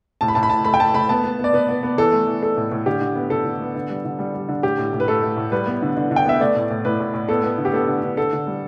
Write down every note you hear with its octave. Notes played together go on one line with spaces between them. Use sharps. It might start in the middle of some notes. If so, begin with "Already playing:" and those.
A2 A5
B5
A2 A5
B5
A2 A5
A3 B5
G5
A3 A5
A3 B5
B3 A5
B3
B3
D5
B3 B4
B3
B3
E3 A4
A3
E3
A3 A4
A2
A2
D3 G4
D3
B3
D3 A4
D3
B3
D3
G3
D3
G3
G3
D3
A2 G4
A2
A2
B4
A3 A4
A3
A2
G3 B4
B3
D3
D3
D3
G5
B3 E5
A3 D5
A2
A2
A2 B4
A2
A2
B3 A4
B3
D3
G4
B3 A4
D3
D3
D3 A4
D3
G3